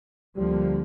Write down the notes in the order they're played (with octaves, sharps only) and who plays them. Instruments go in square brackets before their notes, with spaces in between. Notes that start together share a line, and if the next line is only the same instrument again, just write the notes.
[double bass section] D2 D3 F3 A#3 [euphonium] G3